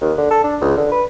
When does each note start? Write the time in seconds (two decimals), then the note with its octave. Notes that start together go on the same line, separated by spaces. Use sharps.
0.01 D#2
0.18 D3
0.31 A4
0.44 D4
0.61 C#2
0.77 D3
0.92 B4